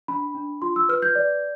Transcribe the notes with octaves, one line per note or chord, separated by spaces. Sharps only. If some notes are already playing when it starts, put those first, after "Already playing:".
D4 B5
D4
F4 C6
E6
B4 F6
G6
D5